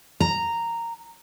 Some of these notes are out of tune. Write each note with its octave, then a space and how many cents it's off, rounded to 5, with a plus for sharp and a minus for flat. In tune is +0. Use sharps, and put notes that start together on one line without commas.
A#5 -10